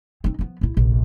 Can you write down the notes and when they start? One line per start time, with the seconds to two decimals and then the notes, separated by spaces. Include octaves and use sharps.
0.24 C4 D#4
0.39 F3 B3
0.61 A#1 E4
0.77 F1 A#1